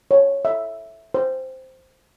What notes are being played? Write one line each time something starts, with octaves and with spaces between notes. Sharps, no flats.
C#5
E5
C5